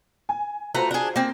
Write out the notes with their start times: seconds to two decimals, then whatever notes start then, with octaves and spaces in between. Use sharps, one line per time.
0.29 G#5
0.75 A3 F4 F#4 B4 C5 A#5
0.91 D4 G#4
1.16 A#3 C4